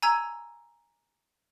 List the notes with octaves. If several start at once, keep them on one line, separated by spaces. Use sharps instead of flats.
G#5 A#5 E6 G#6